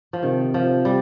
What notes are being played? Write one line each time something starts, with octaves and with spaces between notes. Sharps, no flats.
F3
C3 D#3
F3
G3